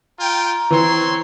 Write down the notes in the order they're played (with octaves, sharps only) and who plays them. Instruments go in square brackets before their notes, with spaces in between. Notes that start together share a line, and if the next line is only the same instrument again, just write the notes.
[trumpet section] F4 G5 [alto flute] A#5
[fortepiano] E3 [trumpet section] C4 C#5 C6